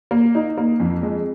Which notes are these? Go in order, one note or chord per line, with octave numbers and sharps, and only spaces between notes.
A#3
D#4
A#3
F2
G#3